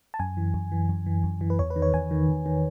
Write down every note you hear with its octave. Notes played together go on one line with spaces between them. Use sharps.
A5
F#2 G#5
E3
F#2
E3
F#2
E3
F#2
E3
B4
E2 C#5
B4
D#3
C#5
E2 G#5
D#3
E2
D#3